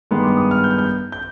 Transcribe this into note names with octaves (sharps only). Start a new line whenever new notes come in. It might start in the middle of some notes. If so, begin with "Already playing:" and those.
G2 D#3 G#3 B3 C6
D6
D#6
F6
G6
F6
G6
G6